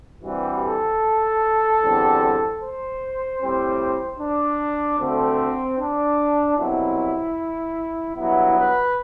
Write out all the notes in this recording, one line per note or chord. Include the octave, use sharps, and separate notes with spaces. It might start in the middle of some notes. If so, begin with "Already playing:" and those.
G2 E3 G3 C4 F#4
A4
E2 D3 G3 C4
C5
A2 G3 C4
D4
D2 D3 A3 C4
D4
C2 B2 F#3 C4 E4
G2 F#3 B3 E4
B4